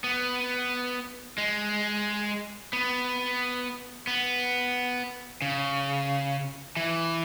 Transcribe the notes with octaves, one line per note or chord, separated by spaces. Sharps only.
B3
G#3
B3
B3
C#3
E3